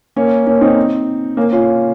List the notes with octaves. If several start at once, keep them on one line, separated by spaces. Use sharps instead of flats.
A#3 C#4
A#3 C#4
C4 D#4
A#3 C#4
C#4 F4